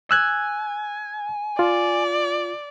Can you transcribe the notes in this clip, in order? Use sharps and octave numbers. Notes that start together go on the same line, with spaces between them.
G#5 E6 F#6 G#6
F4 D5